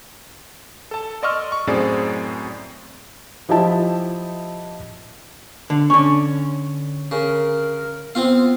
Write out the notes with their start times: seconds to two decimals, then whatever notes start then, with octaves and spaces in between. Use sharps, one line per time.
0.91 A4 A5
1.23 D5 D#5 C6 C#6 E6 F6
1.52 C#6
1.67 F#2 A2 C4 G#4 D5 A6
3.49 F3 E4 G4 D#5 E5 A5
5.70 D3
5.90 D3 C#4 C#6
7.11 C#3 A#4
8.15 B3 C4 F4 F5